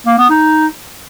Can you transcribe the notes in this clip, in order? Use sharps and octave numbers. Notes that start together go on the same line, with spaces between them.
A#3
B3
D#4